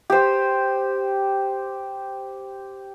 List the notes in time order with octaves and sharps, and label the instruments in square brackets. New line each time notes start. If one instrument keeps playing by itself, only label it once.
[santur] G4 C5